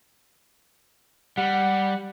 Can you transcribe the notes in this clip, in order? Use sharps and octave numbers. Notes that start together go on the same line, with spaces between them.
G3 F#5